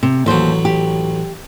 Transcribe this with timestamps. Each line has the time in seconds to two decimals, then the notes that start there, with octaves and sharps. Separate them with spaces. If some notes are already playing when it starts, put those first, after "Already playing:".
0.03 C3
0.26 A1 D#2 F#3 C5
0.65 G4